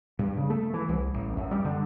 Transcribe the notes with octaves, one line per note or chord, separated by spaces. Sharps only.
G2
C#3
A3
E3
C2
A1
F#2
G3
D3